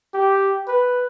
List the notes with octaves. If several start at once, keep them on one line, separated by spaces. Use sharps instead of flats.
G4
B4